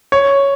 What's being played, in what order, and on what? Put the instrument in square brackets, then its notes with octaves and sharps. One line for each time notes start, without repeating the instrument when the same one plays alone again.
[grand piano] C#5